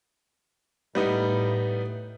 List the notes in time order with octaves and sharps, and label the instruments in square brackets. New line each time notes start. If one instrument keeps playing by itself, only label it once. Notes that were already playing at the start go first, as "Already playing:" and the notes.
[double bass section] A2 [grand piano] G3 B3 D#4